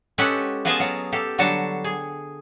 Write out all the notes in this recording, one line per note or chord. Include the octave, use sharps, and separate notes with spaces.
G#3 C#4 G4 A4 B4 F#5
B3 F4 G#4 D#5 G#5 A5
F#3 F5
G4 A4 F5
D3 F#3 G3 F#4 A5
G#4